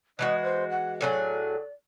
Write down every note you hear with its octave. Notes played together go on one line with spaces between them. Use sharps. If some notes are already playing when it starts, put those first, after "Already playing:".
E3 G#3 F#4 D#5
C5
F#5
A2 F#3 G#4 D5